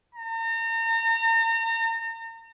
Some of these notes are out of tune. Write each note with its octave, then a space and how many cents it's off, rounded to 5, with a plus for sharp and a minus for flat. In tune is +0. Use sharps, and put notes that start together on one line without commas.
A#5 -40